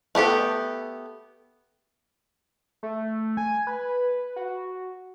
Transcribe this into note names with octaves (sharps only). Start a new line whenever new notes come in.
A3 B3 G4 A4
A3
G#5
B4
F#4